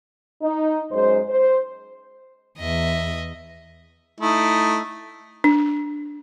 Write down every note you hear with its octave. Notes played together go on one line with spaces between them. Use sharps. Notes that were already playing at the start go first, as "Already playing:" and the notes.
D#4
F#2 G#3 D#4 C5
C5
E2 D#5 E5
A3 D#4 E4
D4